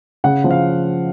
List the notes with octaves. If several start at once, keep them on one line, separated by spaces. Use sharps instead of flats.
C#3 F#5
F3
F5